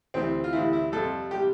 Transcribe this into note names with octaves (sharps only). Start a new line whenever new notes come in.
D2 C3 E3 C4
F4
D2 C3 E3 E4
E4
F2 C3 G3 A4
C3 G3 G4